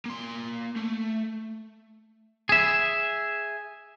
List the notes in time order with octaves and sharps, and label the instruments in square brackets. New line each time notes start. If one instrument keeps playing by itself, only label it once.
[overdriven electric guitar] A#3 C6
A3
[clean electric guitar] G#4 E5